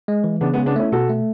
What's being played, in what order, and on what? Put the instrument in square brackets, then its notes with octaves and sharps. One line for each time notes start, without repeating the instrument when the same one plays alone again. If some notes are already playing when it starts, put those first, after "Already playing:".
[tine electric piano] G#3
E3
[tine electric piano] C#3 [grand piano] B3 D4
[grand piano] G#3 B3
[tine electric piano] C#3
[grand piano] B3 D4
[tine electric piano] A3 [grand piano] C#4 E4
[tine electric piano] B2 [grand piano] F#4 A4
[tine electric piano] A3